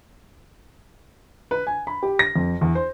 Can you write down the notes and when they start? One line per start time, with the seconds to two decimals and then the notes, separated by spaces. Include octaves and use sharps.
1.51 B4
1.67 G#5
1.87 B5
2.03 G4
2.19 A#6
2.36 F2
2.61 E2
2.75 C5